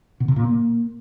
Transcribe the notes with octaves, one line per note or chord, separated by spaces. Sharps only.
B2
C3
A#2
A#3